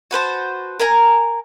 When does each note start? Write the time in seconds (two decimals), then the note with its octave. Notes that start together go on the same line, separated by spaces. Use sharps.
0.11 F#4 B4 C5 A5
0.80 A#4 G#5 A#5